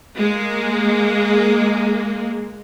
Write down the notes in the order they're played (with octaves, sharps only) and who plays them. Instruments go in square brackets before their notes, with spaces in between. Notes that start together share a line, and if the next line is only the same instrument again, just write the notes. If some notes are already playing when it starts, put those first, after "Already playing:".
[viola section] G#3 A#3